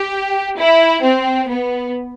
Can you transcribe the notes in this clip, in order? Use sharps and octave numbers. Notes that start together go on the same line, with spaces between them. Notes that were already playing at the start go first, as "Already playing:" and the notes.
Already playing: G4
E4
C4
B3